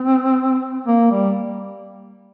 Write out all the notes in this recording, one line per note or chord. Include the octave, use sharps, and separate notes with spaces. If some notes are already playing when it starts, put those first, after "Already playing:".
Already playing: C4
A#3
G3